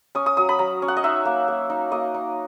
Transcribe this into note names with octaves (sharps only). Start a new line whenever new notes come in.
C#4 D#6
D#6
F#3 D#6
B5
F#3 A#5
C#4
F#5
D#5
D#4 E5
A#3
A#3
D#4
A#3 D#5
D#4